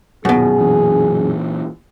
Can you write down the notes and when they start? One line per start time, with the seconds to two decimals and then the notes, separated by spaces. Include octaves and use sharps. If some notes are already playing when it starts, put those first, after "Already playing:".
0.25 D#1 F#2 B2 G#4
0.58 A#2 E3